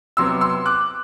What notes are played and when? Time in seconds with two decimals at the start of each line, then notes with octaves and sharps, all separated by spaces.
0.17 C3 F#3 B3 C6 E6
0.41 C6 E6
0.66 D6 F#6